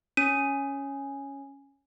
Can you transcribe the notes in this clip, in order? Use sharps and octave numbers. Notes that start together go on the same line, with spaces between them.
C#4 D#7